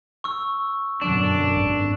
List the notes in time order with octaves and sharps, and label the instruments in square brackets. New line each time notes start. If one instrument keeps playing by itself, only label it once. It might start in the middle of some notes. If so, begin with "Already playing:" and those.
[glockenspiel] C#6 E6
[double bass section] F#2 B2 D3 [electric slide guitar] D4 [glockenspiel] D7
[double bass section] G#1